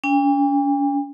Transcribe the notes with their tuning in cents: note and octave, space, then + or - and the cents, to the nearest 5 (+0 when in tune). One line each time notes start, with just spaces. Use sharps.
C#4 +45 G5 +45